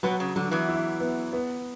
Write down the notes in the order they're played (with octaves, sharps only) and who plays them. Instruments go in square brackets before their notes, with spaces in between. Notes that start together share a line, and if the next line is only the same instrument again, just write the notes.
[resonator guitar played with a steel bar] B2 B3 [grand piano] F#3
[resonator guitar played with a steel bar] C#3
[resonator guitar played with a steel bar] D3 [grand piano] F#3
[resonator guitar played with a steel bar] E2 E3
[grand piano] E4
B3
B3